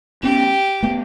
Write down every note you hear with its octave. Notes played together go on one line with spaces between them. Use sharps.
B3 C#4 G4
A3 B3